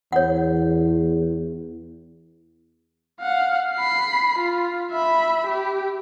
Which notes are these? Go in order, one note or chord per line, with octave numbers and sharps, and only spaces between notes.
E2 C#5 F#5
F5 F#5
B5 C7
F4
E5 B5
G4